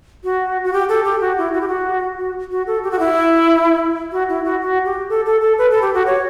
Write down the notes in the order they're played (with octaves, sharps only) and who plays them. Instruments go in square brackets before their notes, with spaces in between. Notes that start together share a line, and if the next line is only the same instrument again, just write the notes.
[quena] F#4
F#4
G4
A4
G4
F#4
E4
F#4
G4
F#4
F#4
F#4
A4
G4
F#4
E4
F#4
E4
F#4
F#4
G4
A4
A4
A4
B4
A4
G4
F#4
C#5